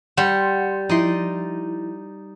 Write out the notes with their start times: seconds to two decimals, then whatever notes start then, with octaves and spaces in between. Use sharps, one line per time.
0.17 G3 F#5 C6 C#7
0.89 F3 D#4 E4 D5 C6